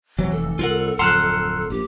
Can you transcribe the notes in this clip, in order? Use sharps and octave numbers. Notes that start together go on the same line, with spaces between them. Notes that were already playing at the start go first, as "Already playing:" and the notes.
C#2 C3 E3 F#3
F1 A4
C2 F4 A#4 F#5
D1 F2 F#5 A5 A#5 C6 F6 F#6
A#1 G4